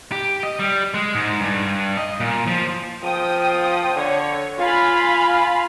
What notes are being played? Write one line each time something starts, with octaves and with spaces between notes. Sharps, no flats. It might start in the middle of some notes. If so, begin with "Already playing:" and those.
G4
D#5
G3
G#3
G#2
G2
D#5
A#2
F3
F3 G5 D#6
D3 C#5
F4 F5 G#5 B5